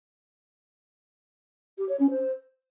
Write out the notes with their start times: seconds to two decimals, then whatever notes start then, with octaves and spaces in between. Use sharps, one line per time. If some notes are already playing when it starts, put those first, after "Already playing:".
1.78 G4
1.88 C#5
1.99 C#4
2.10 C5